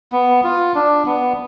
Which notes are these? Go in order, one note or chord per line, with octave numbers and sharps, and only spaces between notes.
B3
F4
D4
B3